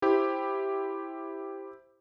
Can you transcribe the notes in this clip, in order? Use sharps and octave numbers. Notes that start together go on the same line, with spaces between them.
E4 G4 C5